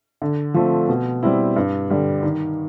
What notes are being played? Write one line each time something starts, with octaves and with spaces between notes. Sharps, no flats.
D3
F3 A3 C4
B2
G3 C4 E4
G2
D3 G3
D#3